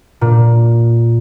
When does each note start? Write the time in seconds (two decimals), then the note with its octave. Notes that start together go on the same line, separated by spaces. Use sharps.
0.21 A#2